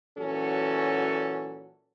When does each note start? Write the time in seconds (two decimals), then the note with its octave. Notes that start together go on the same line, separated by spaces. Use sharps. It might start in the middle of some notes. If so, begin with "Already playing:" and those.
0.18 A#2 E3 F#3 C#4 F#4 A4